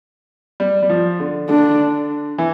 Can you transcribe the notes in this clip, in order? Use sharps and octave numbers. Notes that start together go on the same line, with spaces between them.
G3
G3
F3
D3
D3 D4
E3